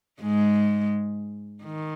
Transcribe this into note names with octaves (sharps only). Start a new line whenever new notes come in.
G#2 G#3
D#3